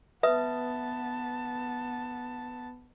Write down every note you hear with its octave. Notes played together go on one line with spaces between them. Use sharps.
B3 B4 E5 A5 D#6